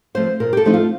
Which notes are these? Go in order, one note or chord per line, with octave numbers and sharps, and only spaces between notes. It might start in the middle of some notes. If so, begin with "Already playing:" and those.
F3 A3 C4 C5
A#2 A#4
G4
A4
F3 A3 C4 D#4
F4